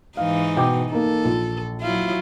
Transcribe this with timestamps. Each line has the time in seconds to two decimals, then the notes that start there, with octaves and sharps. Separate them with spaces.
0.17 G#2 E3 D#4 F5
0.56 B2 G5 D6
0.92 A#3 D#4 A4
1.25 A#1
1.81 F#3 E4 F4